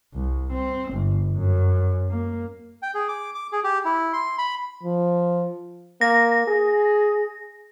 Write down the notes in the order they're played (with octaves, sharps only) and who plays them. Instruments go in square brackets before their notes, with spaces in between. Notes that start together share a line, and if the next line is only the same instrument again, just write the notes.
[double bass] C2
C4
G1
F#2
A#3
[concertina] G5
G#4
D6
D6
G#4
G4
E4
C6
B5
[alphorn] F3
[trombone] A#3 [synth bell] A#6
[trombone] G#4